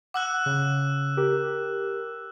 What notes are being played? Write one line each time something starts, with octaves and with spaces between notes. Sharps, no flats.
F#5 D6 E6 F#6
C#3
G4 A#4